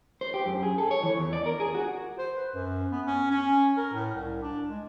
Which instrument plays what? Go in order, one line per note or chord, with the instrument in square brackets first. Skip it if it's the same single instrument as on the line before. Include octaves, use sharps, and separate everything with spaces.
[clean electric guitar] C5
G4
F#2
G#4
A4
C#5
E3
E2
D5
A#4
G#4
F#4
[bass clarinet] C5
B4
F#2
B3
C#4
C#4
A#4
A2
C2
D4
G#3